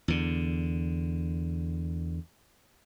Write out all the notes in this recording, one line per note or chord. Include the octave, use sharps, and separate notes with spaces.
E2 D3